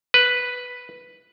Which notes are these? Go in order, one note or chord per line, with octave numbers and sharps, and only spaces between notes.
B4